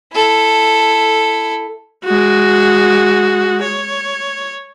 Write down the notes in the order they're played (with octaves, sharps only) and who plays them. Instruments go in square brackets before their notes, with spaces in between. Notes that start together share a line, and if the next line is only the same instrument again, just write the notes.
[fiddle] E4 A4
[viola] G#3 F#4
C#5